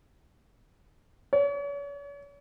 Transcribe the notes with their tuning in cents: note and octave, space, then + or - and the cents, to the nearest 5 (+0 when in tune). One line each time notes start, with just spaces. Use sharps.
C#5 +40